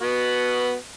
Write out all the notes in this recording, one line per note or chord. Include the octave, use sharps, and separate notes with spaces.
B3 F#4